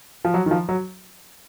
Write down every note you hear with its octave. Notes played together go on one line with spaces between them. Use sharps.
F3
F#3
D#3
F3
F#3